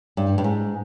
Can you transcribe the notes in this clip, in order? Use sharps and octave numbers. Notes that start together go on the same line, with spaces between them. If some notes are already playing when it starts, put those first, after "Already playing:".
G2
G2
G#2